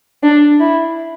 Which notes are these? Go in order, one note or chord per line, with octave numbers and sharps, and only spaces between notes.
D4
E4